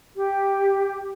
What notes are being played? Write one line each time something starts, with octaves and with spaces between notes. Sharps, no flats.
G4